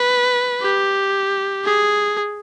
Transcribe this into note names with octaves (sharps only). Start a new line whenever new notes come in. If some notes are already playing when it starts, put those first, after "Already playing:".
Already playing: B4
G4
G#4